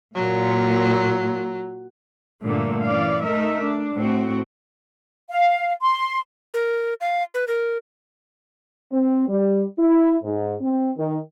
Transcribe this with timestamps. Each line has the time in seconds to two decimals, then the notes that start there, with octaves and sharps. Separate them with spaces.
0.15 A#2 F#3
2.44 G2 A#2 D3 A3 A#3
2.85 E3 C#4 D5 F5
3.24 A3 D#4 A#4 E5
3.63 D4
3.95 A2 C4 F#4
5.29 F5
5.82 C6
6.54 A#4
7.01 F5
7.34 B4
7.48 A#4
8.92 C4
9.29 G3
9.79 E4
10.24 G#2
10.61 C4
10.97 D#3